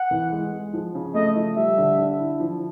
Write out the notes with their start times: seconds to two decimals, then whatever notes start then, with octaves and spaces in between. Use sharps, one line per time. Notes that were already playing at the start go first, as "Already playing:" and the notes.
Already playing: F#5
0.11 E3
0.32 G#3
0.53 G#3
0.73 F3
0.95 C#3
1.14 A3 D#5
1.36 F3
1.56 G3 E5
1.78 D3
1.98 D3
2.19 E4
2.40 F3